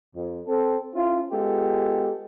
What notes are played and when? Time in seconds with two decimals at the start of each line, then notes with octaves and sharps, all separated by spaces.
0.16 F2
0.47 C4 A4
0.95 C#4 E4 F4
1.31 G#3 B3 F4 G4 A4